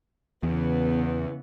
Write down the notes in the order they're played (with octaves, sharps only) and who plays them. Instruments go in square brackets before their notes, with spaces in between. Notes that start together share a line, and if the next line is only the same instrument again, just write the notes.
[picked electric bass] E2 [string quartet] C#3 E3 B3